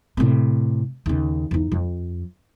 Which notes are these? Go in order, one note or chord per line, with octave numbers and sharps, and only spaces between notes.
A2 C3
D#2 C#3
E2 D#4
F2